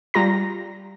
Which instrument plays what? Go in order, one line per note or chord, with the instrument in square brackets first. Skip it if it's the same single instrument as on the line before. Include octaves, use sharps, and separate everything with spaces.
[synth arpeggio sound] G3 F4 A#5 A#6